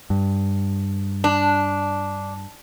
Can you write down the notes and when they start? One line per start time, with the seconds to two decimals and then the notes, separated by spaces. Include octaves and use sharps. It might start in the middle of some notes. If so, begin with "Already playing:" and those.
0.10 G2
1.24 D4